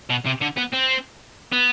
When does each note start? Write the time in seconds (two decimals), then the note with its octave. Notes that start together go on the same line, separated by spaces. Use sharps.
0.10 B2
0.25 C3
0.41 D3
0.57 B3
0.73 C4
1.52 B3